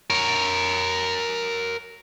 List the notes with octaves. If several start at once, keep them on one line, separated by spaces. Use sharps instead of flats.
A#4 C#5